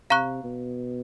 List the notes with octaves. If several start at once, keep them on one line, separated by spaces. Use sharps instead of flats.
C3 F5 A#5 C#6 F#6
B2